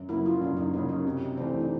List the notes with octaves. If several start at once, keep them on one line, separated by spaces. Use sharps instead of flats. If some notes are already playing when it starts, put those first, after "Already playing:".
Already playing: F#2
C#3 F#3 A#3 E4
F4
F#2 D4
D#4
C#3 F#3 A#3 D#4
D#4
C3
E3 A3 C4 D4
D#4